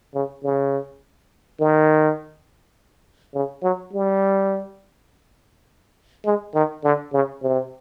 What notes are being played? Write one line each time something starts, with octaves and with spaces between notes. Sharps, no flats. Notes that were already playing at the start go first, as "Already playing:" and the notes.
C#3
C#3
D#3
C#3
F#3
G3
G#3
D#3
D3
C#3
C3